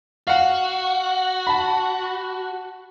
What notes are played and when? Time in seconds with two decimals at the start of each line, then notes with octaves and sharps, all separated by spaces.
0.27 F#4 F5 F#5
1.47 A5 B5